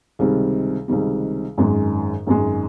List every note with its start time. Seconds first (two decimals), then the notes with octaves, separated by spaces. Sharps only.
0.19 C#2 C3 D#3 G3
0.88 C#2 C3 D#3 G3
1.58 G#1 F#2 D#3 G#3
2.27 G#1 F#2 D#3 G#3